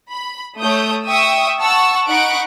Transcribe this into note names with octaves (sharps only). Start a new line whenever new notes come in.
B5
A3 C#5 D#6 G6
E5 G5 C#6 D#6 E6
F#5 A5 C#6 E6
D#4 F#5 B5 C#6 F#6 D7